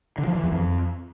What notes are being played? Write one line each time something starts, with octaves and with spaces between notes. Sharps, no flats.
D3
F3
E3
E2
F2